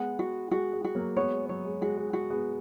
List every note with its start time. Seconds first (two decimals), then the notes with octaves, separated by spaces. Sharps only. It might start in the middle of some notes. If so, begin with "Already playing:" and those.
Already playing: G#3 B3 F#5
0.19 F#4
0.51 G#3 F#4
0.73 G#3
0.84 F#4
0.95 F#3 A#3
1.17 G#3 B3 C#5
1.33 G#3
1.49 F#3 C#5
1.65 G#3
1.81 G#3 F#4
1.97 G#3
2.13 G#3 F#4
2.30 G#3 B3